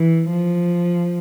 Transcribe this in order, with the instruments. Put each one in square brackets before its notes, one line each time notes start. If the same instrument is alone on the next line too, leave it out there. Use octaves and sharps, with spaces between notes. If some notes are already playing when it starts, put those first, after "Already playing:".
Already playing: [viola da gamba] E3
F3